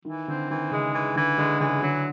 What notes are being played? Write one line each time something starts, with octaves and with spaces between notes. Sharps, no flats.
D#3 E3
D3 C4
D#3 E3
C#3 G#3
E3
D3 E3
D3 G#3
C#3 E3
D3 F#3